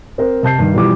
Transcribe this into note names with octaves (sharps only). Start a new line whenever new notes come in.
C4 A#4 C5
C3 A5 G6 C7
G2 D#3
B2 E3 F3 G3 G4 D6